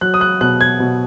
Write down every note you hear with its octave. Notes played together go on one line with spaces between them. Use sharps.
F#3 F#6
D#6
F#6
B2 F#6
G#6
B2